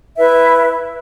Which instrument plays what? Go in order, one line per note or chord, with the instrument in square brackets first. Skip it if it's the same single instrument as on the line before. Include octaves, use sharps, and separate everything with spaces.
[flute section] E4 B4 E5